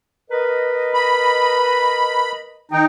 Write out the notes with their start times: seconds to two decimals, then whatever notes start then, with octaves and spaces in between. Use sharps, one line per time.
0.31 A#4 B4 D#5
0.94 B5
2.71 D#3 D#4 G5